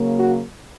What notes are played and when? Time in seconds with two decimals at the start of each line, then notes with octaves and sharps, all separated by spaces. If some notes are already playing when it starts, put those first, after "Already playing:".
Already playing: C#3 F#3 A#3
0.19 F#4